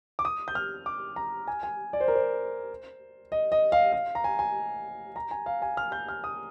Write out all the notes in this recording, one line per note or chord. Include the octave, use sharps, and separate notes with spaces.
D6
D#6
G6
F6
D6
A#5
G#5
G#5
D5
C5
A#4
C5
D#5
D#5
F5
F5
A#5
G#5
G#5
A#5
G#5
F5
G#5
F6
G6
F6
D#6